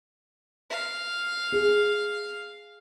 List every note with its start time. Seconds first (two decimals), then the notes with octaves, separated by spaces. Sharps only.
0.70 F5
1.52 G#4